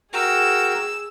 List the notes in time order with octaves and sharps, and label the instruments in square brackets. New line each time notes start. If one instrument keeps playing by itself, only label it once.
[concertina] F#4 A#4 G5 [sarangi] G#4 [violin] E6